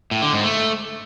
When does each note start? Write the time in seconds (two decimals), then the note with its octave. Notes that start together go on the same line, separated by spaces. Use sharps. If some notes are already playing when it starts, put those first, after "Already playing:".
0.11 A2
0.22 D3
0.33 G#2
0.44 A3